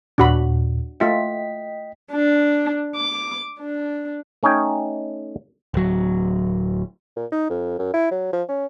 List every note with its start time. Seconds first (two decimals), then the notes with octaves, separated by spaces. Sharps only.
0.18 D#2 A#2 D4 F#4 B5
1.00 A3 F4 D#5 E5 G5 B6
2.12 D4
2.96 D6
3.59 D4
4.43 A3 C#4 D#4 C#5 G5
5.74 D1 F#3
7.17 A#2
7.32 D#4
7.50 F2
7.79 F#2
7.94 E4
8.11 F#3
8.33 F3
8.49 C#4